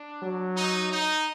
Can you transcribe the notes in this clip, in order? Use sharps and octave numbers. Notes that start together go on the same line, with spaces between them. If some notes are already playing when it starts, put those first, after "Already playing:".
Already playing: D4
F#3
D#4
D#4